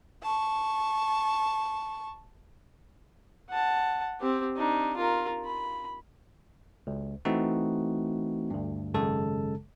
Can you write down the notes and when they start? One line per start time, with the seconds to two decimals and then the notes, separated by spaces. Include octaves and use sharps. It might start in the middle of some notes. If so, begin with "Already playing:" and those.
0.22 A5 C#6
3.50 F#5 A5
4.20 C4 G4
4.57 D4 D#4
4.96 F4 A#4
5.44 B5
6.87 C#2
7.25 E3 A3 C4 D#4 F#4
8.50 D2 G2
8.94 G#1 F#2 C#3 G#3 A4 A5